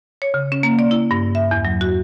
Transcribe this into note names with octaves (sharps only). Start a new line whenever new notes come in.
C#5
C#3
C#4
A#3
D5
E4
G2
E5
E2
F#3
F#4